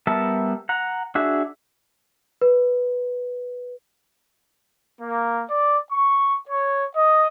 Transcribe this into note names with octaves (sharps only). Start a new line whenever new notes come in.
G3 B3 A#4 E5 A5
F#5 A#5
D4 F#4 G#4 E5
B4
A#3
D5
C#6
C#5
D#5